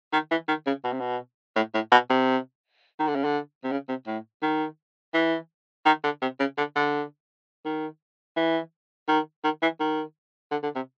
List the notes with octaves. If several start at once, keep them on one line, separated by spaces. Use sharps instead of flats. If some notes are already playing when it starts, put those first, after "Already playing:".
D#3
E3
D#3
C#3
B2
C3
B2
A2
A2
B2
C3
D#3
D3
C#3
D3
C3
C#3
C3
A2
D#3
E3
D#3
D3
C3
C#3
D3
D3
D#3
E3
D#3
D#3
E3
D#3
D3
D3
C3